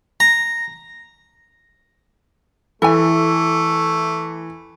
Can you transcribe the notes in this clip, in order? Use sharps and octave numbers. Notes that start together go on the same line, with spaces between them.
A#5
E3 A3 A4 G#5